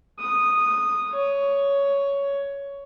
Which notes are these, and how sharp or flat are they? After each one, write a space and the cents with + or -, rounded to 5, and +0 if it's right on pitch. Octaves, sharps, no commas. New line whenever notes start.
D#6 -10
C#5 +10